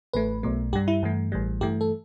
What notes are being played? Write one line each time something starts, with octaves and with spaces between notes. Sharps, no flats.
A1 A2 A3 B4
B1 B2 A3
G2 G3 G4
E4
G2 E3 A3
A1 A2 E3 G3
G2 E3 A3 G4
A4